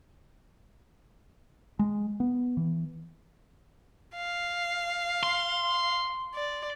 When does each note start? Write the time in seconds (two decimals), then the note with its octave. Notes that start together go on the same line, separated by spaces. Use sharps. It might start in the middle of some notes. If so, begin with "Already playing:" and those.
1.79 G#3
2.20 B3
2.57 E3
4.16 F5
5.23 C6
6.34 D5